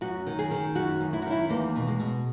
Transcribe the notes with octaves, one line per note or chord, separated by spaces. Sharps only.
F#2 F#4
D#3
G#4
D#3
F#2 F#4
F#2
E4
F#4
D#3 E4
E2 A#3
B2
G#3
B2